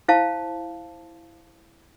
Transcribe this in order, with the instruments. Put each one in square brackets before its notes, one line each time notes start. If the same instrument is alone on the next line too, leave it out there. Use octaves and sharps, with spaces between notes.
[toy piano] E4 C5 F5 A5